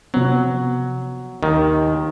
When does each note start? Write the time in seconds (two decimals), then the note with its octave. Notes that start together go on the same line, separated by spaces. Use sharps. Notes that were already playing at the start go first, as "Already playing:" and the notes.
0.14 C3 F3 F#3 B3
1.43 D#2 D#3